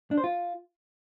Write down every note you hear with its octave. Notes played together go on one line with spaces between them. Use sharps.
D4
C5
F4